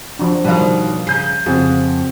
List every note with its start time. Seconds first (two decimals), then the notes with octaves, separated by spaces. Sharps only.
0.19 F3 D4 F#4 A#5
0.45 B2 D#3 F3 G3 C#5 D5 F5
1.07 C#3 A#5 G6 C7
1.46 F2 C#3 C4 F4 F#4 G#4